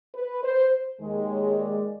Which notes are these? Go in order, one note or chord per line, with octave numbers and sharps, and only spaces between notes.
B4
C5
D#2 D#3 G#3
C#5
D5